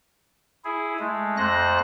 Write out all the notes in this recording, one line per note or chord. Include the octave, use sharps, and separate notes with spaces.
E4 G#4
G#3 A3
F2 A3 C5 F#6 A#6